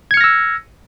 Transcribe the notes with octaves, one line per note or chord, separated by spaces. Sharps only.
E6 F6 G#6 A#6 C#7